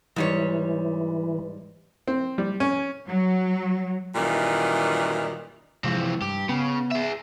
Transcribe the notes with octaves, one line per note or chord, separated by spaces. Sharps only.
G#2 E3 G3 C#5
C4
G3
C#4
F#3
F#2 A#2 D#3 E3 G3
C3 E3 F3 G#3 C4
G2 G4
C#3 B3
G#4 E5